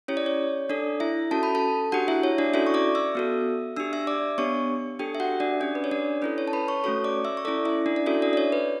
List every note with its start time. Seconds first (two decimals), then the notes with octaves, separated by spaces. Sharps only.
0.08 C#4 E4 G4 C#5
0.17 D5
0.26 C#5
0.69 D4 A4 D5
1.00 E4 E5
1.31 C#4 F#4 A4 A5
1.43 B5
1.55 A4 A5
1.92 D4 F#4 G4 F#5
2.08 E4 E5
2.23 C#5
2.38 D4 D5
2.54 C#4 E4 F#4 A4 E5
2.67 C#6
2.74 D5 D6
2.95 E5 E6
3.15 B3 F#4 A4
3.77 D4 G4 E6
3.93 E5 E6
4.07 D5 D6
4.38 B3 D4 G4 C#5 C#6
4.99 D4 G4 A4 G5
5.15 E5
5.20 F#4 F#5
5.40 D4 D5
5.61 C#4 D4 G4 D5
5.75 B4
5.84 C#5
5.91 D4 D5
6.22 C#4 E4 A4 B4
6.38 C#5
6.48 A5
6.53 B4 B5
6.68 C#5 C#6
6.84 A3 C#4 F#4 A4 C#5 C#6
7.04 D5 D6
7.25 E5 E6
7.37 C#6
7.45 C#4 E4 A4 D5 D6
7.65 E4 E5
7.86 D4 D5
7.96 D5
8.06 C#4 E4 F#4 A4 E5
8.22 D4 D5
8.33 D5
8.37 C#5
8.52 B4